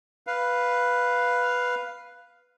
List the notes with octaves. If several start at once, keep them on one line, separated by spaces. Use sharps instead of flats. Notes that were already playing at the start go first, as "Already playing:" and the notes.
B4 F5